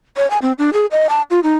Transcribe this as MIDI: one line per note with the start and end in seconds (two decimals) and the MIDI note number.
0.17 0.29 73
0.30 0.38 80
0.42 0.52 60
0.58 0.70 62
0.73 0.86 68
0.92 1.07 75
1.09 1.22 81
1.30 1.40 65
1.43 1.56 63